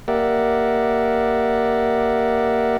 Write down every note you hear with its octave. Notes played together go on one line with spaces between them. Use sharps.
A#3 G4 A#4 D5 E5 F#5